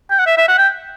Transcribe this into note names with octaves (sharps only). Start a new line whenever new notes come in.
G5
F#5
E5
E5
F#5
G5